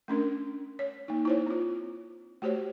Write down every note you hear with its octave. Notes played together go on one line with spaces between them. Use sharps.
A3 C#4 D4 A#4
C#5
A#3 D#4
E4 C5 C#5
C4 F4
A3 F#4 G4 C5 C#5